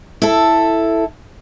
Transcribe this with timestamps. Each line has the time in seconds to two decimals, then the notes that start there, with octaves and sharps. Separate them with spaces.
0.22 E4 A4